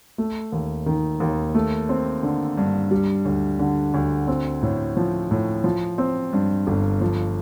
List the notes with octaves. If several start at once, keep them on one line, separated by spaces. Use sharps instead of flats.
A3
D#2
D#3
D#2
A3
C4
D3
G2
G3
D2
D3
D2
C4
A2
F3
A2
F3
C4
G2
G1
F3